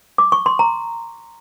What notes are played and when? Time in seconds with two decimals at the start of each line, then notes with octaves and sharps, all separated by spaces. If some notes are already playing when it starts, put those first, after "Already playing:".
0.18 D6
0.32 C#6
0.46 C6
0.59 A#5